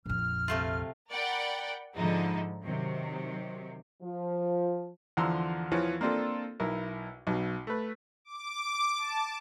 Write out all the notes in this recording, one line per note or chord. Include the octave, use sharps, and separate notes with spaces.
A#1 F2 F6
C3 A3 F4
A#4 D5 F#5 G5 B5
G#2 D3 F3 G#3 D#4 E4
C3 D#3 F#3
F3
E2 D3 F3 A#5 C6 E6
E2 E3 F3 C#5
A#3 C4 D4 F4 A4
B1 E4 A#4
B1 B2
A3 B4
D6
A5